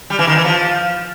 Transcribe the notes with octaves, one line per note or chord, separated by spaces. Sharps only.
G3
E3
D#3
E3
F3